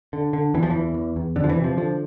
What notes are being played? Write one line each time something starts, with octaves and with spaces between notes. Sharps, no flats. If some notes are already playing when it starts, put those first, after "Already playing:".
D3
D3
E2 E3
F3
E2 E3
E2
E2
F2 D3
F3
E3
C3
F3
D3 F3